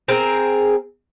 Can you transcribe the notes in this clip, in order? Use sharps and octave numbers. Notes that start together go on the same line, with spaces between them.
C4 G#4 A#4